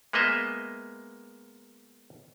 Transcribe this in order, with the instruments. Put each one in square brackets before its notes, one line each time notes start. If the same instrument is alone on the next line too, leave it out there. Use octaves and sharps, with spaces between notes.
[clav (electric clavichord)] G#3 A#3 B3 D#5 E5